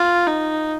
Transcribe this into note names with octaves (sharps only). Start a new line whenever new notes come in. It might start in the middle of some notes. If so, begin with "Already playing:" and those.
Already playing: F4
D#4